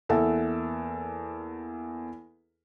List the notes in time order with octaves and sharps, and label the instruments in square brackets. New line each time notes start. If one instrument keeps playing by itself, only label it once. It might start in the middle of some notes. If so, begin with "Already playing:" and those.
[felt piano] E2 A#3 A4 E5 F#5